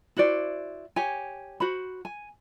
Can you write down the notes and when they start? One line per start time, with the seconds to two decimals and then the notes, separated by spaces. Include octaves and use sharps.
0.17 E4 F#4 C5 D5
0.96 G4 C#5 G#5
1.60 F#4 C5 B5
2.05 G#5